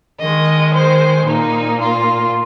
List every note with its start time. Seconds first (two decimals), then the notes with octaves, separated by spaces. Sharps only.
0.21 D#3 G#3 D#5
0.74 C5
1.26 A#2 A#3 D#4
1.79 F4